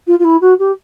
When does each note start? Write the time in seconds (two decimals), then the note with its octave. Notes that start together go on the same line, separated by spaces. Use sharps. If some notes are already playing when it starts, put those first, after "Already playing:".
0.07 F4
0.19 F4
0.24 E4
0.41 F#4
0.59 G4